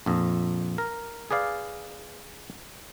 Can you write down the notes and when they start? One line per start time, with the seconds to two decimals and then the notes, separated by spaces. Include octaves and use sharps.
0.06 A#1 F2
0.78 A#4
1.31 G#4 B4 D5 F5